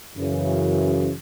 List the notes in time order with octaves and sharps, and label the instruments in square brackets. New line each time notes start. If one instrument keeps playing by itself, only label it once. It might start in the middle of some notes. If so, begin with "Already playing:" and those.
[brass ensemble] F#2 C#3 E3